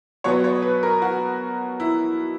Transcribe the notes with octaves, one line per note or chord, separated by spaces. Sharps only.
B2 F#3 B3 C#5
C#5
B4
A#4
F#4
E4